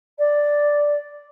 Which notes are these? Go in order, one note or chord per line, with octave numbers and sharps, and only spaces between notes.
D5